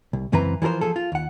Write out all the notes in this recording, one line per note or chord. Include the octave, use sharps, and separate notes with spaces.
C2
C#2 F#2 E3 C4 B4 A#5
E3 F3 A4 A#4 C5
F3 G#4 A4
F4
D#2 F#5